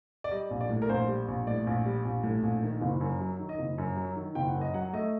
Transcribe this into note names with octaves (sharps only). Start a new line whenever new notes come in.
D5
G3 D#5
A#1
D5
A2
A#4
A#1 C5
G3
A#1
A2 D5
A#1
G3
A#1
A2
A#1
D#3
F#1
F#2
F#3
D#3
D#5
F#1
F#2
F#3
D#3
F#1 G5
F#5
F#2
D#5
F#3 F#5
A3 D#5